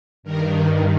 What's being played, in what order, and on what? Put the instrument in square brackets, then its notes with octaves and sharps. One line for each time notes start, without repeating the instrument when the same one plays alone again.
[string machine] G2 D#3 A#4